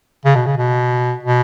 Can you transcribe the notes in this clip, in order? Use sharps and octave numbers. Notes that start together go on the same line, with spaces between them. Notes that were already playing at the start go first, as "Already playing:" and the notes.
C#3
B2
C#3
B2
B2